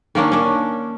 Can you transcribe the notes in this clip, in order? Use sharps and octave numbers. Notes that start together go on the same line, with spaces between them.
D#3 A#3 C#4 D4
C#4 D4